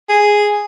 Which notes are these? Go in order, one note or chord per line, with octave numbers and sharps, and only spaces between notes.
G#4